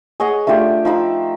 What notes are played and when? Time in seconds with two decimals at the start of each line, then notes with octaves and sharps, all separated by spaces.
0.20 G#4 C#5 D#5 F#5
0.47 A3 D4 F4 G4
0.85 F3 D#4 B5 E6